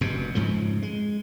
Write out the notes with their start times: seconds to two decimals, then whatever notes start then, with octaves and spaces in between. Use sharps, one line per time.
0.01 F1 G2 B2
0.35 F2 G#2 C#3 F3
0.82 G#3